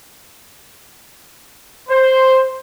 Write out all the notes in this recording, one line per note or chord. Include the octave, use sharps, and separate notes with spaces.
C5